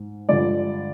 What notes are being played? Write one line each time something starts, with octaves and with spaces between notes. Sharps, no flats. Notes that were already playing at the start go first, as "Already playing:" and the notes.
Already playing: G#2
G2 D3 F3 G#3 D5